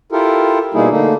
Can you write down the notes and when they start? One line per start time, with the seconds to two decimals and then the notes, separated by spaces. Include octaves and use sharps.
0.12 E4 F4 G4 A4 A#4
0.74 B2 G3 A#3 D#4 E4 G#4
0.91 D3 A3 A#3 D4 D#4